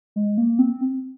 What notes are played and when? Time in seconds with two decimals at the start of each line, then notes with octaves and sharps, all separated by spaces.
0.16 G#3
0.38 A#3
0.59 C4